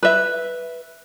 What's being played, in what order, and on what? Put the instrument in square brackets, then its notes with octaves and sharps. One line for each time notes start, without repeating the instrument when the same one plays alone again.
[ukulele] B4 E5